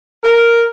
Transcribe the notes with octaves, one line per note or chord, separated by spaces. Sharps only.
A#4